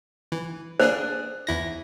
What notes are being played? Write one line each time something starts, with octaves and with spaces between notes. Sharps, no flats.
E3
A#3 D4 G#4 C5
E2 E4 A#6